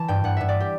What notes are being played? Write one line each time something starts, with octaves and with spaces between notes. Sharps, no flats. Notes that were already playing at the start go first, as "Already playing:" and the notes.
Already playing: E3 A5
G2 G5
G2 F#5
G2 E5
D5
G4